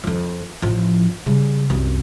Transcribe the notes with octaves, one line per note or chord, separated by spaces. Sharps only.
F2 F3
A1 F3
C#3 G3
C2 F#2